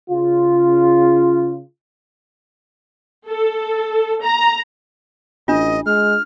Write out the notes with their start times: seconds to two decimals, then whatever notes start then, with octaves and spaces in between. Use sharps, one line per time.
0.10 C#3 F4
3.28 A4
4.23 A#5
5.48 A1 D4 F4 D#5
5.86 G#3 F6